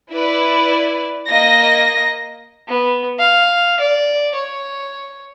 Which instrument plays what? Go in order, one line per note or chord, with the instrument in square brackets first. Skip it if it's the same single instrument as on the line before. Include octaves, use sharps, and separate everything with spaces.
[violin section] E4 B4 D5
A#3 D#5 A#6
[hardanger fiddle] B3
F5
D5
C#5